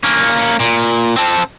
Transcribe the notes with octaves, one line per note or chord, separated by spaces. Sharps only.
A#3 C#4
A#2
C4 A4